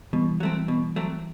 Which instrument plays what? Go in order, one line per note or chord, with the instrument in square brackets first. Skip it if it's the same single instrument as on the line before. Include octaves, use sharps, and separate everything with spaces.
[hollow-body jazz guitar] B2 [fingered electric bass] E3 G3
[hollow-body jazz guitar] F#3 A3 C4
B2
F#3 A3 C4